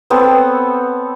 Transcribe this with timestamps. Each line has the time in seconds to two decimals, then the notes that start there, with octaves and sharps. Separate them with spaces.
0.10 B3 C4 A4 C#5